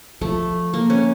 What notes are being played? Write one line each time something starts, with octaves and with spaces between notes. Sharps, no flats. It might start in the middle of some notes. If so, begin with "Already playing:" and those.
F3 A3
A#3
C#4